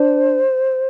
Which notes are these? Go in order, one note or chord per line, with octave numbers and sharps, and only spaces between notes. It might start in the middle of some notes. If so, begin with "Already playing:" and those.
Already playing: D4 C5